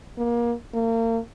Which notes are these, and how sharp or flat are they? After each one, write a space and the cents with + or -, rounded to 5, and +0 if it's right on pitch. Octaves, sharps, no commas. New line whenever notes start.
A#3 +25
A#3 -35